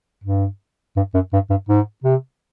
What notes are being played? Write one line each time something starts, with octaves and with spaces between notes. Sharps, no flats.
G2
G2
F#2
G2
G2
G#2
C3